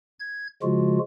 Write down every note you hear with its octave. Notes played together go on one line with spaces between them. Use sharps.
G#6
C#3 F3 G#3 F4 F#4